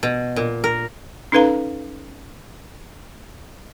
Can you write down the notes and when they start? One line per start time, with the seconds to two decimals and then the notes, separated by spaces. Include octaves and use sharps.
0.03 B2
0.36 A#2
0.64 A#4
1.32 C#4 D#4 A4 B4 F5 A#5